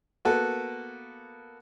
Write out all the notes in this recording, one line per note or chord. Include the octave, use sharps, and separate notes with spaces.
A#3 B3 F#4 A4 B4